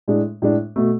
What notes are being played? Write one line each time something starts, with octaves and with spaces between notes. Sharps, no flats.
A2 G#3 D4
A2 G#3 D4
B2 A3